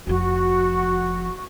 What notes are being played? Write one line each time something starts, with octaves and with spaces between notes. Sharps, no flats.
F1 F3 F#4